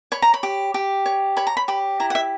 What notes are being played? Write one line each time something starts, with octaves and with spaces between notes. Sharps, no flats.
C#5 B5
A#5
B5
G4
G4
C#5
C#5 B5
A#5
B5
G4 B5
E4 A#5
F#5
E5